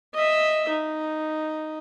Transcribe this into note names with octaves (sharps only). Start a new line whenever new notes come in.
D#5 E5
D#4